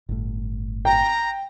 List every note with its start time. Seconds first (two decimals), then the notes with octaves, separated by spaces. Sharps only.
0.09 G1 A2
0.85 G5 A#5